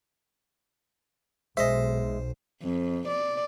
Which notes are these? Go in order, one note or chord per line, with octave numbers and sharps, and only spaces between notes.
B1 G#3 C5 D#5 E5
F2
D5